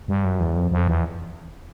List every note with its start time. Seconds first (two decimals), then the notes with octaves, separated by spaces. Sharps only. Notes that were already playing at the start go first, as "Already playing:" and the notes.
0.08 G2
0.24 F#2
0.40 E2
0.56 F2
0.71 F2
0.87 E2